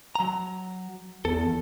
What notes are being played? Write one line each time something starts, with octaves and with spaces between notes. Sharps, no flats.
F#3 A#5
E2 A4